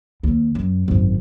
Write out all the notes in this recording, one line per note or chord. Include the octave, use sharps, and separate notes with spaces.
D#2
F#2
G#1 F#2